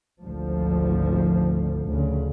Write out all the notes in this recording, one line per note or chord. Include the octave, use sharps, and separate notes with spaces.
G#1 D2 F3
D2 C#3